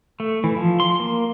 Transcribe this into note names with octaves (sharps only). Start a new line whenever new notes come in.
A3
E3
F3
C6
A#3